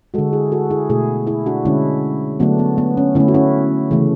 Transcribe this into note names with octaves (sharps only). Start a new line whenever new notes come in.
D3 G#3 F#4 A4
E4 G#4
F#4 A4
E4 G#4
B2 A3 E4 G#4
E4 G#4
D4 F#4
D3 G#3 C#4 E4
D3 F#3 A3 B3 D4
B3
B3
C#4
D3 A3 C#4 E4
F#4
C#4 E4
C#3 E3 A3